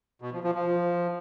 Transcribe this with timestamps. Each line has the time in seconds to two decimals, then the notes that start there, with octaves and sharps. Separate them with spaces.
0.22 B2
0.33 F3
0.44 F3
0.55 F3